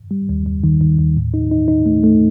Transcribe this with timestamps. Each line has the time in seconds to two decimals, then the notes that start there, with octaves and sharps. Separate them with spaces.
0.11 G3
0.29 D#2
0.46 D#2
0.64 D#3
0.81 D#3
0.99 D#2
1.16 A2
1.34 D#4
1.51 D#4
1.68 D#4
1.86 A3
2.04 A3